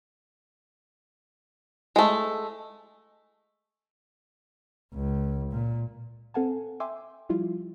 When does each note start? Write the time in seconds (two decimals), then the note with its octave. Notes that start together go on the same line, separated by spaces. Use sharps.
1.96 G#3 A3
4.93 C#2
5.51 A#2
6.34 C4 A4 F5 F#5 G#5 A5
6.80 E5 G5 G#5 C6 D6 E6
7.29 F3 G3 E4 F4